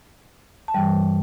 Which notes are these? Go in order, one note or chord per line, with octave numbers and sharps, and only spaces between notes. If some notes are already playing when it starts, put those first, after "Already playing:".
A5
G2 E3 G3 G5